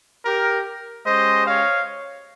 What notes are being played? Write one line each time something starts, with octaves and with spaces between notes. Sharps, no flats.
G4 A#4
G#3 C#4 G4 C5 D#5
C#5 F5